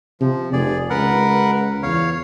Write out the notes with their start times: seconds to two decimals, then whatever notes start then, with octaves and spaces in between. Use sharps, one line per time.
0.21 C3 F3
0.53 F1 G#4 D5
0.90 C#2 A#4 B4 F#5
1.83 E2 C#5 F5